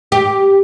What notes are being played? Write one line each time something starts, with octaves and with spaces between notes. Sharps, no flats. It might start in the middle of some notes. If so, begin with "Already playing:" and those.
G4